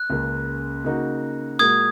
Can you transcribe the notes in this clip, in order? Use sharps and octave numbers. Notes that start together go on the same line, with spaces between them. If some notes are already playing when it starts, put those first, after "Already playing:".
Already playing: F#6
C#2 C#3 A#3
C#3 A#3 D#4 F#4
A#2 G#3 F#4 A#4 D#6 G#6